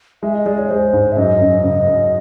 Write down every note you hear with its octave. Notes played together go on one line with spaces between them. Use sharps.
G#3 E5
D#5
G#3 D5
C#5
G#3 C5
G#2
E5
F#2 D#5
F#2
C#3
F#2